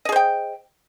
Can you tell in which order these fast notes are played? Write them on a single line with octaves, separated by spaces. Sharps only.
D#5 G#4 C5 G5